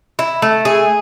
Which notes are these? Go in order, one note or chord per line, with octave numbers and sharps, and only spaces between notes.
E4
A3
G#4